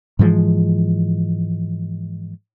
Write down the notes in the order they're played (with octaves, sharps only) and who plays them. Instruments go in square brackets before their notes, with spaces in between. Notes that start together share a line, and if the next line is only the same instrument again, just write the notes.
[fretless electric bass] G#2 E3 F3 G#3